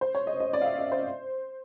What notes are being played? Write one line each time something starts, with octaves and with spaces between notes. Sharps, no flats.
C5
C#5
D#5
D#5
D5
F5
E5
D#5
C5